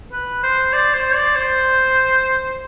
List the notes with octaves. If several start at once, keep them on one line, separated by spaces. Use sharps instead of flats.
B4
C5
D5
C5
D5
C5